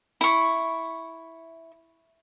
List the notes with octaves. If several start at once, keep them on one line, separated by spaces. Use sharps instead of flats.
E4 C#6